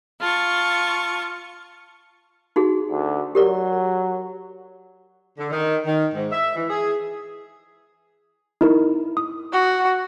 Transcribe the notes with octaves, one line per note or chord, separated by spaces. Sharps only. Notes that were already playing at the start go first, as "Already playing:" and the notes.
F4 A5 C#6
D#4 F#4 G#4
D2
F#3 G4 A#4 D5
D3
D#3
D#3
G#2
E5
E3
G#4
D#4 E4 A#4
D#6
F#4